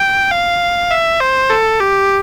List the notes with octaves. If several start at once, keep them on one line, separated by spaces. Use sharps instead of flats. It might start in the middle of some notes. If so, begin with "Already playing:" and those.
Already playing: G5
F5
E5
C5
A4
G4